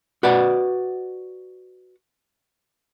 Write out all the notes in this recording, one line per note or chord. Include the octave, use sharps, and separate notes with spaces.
F#4 B4 D5 F#5